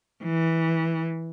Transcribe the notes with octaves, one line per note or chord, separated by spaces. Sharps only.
E3